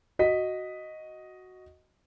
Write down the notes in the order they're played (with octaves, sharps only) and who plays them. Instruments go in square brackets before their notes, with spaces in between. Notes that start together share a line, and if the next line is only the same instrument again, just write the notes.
[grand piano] F#4 D#5 B6